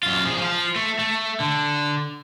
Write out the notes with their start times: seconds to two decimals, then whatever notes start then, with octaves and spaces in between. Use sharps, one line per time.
0.03 F#2 F4
0.25 F3 G#4
0.42 F3 F4
0.76 A3
0.99 A3
1.40 D3